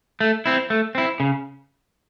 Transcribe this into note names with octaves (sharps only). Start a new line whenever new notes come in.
A3
C4 E4
A3
C4 E4
C#3